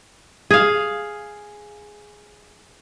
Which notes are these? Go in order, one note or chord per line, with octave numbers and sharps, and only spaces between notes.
G#4 F5